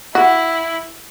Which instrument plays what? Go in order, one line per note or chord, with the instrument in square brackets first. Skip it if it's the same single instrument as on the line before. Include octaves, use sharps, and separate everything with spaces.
[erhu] E4 [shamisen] F#4